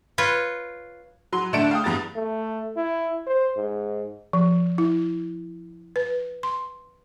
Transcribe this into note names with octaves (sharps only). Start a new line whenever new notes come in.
F4 B4 C#5
F#3 C6
D3 A3 D4 A5 D7 E7
F5 G5 D#6
E2 G2 A#5 A6
A3
E4
C5
G#2
F3
E4
B4
C6